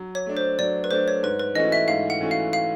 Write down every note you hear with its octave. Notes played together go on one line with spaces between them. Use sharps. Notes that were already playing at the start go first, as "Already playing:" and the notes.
Already playing: F#3
C#5
A3 D4
C5
F#3 D5
B4
A3 D4 C5
C#5
G#2 B4
B4
E3 A3 C#4 F#4 D#5
E5
G#2 F5
F#5
E3 A3 C#4 F#4
F5
F5